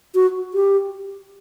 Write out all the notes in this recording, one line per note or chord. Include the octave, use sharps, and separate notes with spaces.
F#4
G4